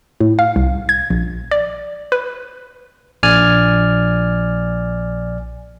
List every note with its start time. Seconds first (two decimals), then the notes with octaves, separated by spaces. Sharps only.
0.21 A2
0.39 F5
0.56 C2
0.89 G#6
1.10 A#1
1.51 D5
2.12 B4
3.23 A#1 D5 G#5 F6